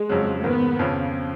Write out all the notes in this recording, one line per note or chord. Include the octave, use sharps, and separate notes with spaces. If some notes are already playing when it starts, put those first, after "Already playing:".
Already playing: G#3
F2 C#3 F#3
G#2 D#3 A#3 B3
F2 C#3 F3